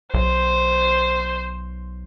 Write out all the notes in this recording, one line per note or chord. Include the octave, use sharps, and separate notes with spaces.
B1 C5